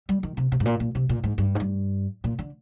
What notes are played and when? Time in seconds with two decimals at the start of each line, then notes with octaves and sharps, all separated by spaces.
0.09 G3
0.23 D#3
0.37 C3
0.52 C3
0.60 G#2
0.65 A#2
0.80 A#2
0.95 C3
1.09 A#2
1.23 G#2
1.38 G2
1.55 G#2
1.60 G2
2.24 A#2
2.39 D3